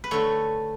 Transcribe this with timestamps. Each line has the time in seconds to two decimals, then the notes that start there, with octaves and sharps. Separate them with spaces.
0.04 B4
0.11 D3 A3 A4 C#5